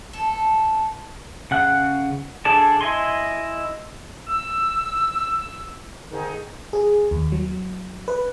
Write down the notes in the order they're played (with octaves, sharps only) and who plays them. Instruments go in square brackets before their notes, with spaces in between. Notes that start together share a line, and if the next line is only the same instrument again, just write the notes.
[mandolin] A4
[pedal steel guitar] C#3 F#5 F#6
D4 G#4 A4 D5 A5
E4 D#5 G#5 C6
[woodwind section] E6
F2 D3 D#3 D#4 G#4
[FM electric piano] G#4
D#2
F#3
B4